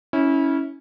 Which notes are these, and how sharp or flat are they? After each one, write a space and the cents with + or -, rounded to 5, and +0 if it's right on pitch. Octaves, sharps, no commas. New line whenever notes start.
C#4 +0 E4 -25